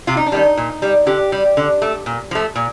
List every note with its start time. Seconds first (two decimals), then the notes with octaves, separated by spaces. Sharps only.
0.07 C3 F4
0.17 D#4
0.26 D4
0.32 D#3 G3 D#4
0.57 A#2
0.82 G3
1.06 D3 G4
1.32 G3
1.57 D3
1.82 A3
2.06 A#2
2.31 F3 A3
2.55 A#2